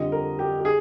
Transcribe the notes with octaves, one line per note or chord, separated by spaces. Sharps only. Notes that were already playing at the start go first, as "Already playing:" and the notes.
Already playing: F2 D3 G3 D4 D#5
A#4
G4
G4
G#4